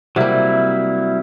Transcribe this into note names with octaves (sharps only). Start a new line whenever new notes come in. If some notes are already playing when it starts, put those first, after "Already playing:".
C3 F#3 G3 A#3 E4